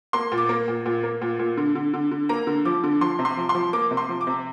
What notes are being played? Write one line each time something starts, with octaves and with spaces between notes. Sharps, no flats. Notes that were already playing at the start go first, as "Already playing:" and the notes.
A#3 C6
A#2
D6
A#3
A#2
A#2
A#3
A#2
A#2
D3
D3
D3
D3
A#3 A#5
D3
F3 D6
D3
F3 C6
C3
C6
F3
C6
F3
A#3 D6
C3
C6
F3
D6
C3